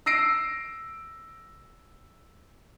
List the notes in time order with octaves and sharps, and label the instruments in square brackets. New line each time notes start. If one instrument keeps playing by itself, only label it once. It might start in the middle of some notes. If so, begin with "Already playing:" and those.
[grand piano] E6 A#6 C7 D7